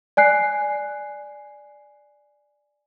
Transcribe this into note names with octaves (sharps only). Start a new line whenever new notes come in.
D5 G#5 F#6 C7